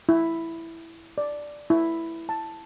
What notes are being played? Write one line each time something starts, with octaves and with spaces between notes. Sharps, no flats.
E4
D5
E4
A5